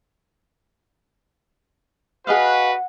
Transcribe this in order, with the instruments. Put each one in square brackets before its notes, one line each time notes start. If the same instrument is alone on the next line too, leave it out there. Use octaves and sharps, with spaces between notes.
[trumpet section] F#4 B4 [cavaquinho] G#4 D#5 F5 [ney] F#5